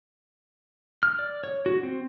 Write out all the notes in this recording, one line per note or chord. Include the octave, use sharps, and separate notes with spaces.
F6
D5
C#5
F#4
C4